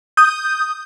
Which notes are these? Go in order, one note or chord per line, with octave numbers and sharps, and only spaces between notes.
D#6 G6